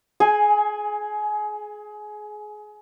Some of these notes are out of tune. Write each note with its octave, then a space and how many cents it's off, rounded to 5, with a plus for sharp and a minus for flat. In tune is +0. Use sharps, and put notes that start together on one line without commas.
G#4 +25 G#5 +0